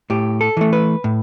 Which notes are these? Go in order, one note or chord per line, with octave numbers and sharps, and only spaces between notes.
A2 G4
A4
E3 A3
B4
A2